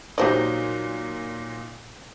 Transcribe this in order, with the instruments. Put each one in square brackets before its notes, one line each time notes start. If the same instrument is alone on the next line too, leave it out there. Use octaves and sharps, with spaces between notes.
[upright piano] A#2 F#3 D#4 [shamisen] G4 C5 D5